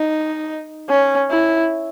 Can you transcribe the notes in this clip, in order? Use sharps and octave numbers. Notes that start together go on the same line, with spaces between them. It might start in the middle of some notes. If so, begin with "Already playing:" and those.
Already playing: D#4
C#4
E4